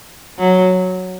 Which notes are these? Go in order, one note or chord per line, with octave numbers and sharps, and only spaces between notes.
F#3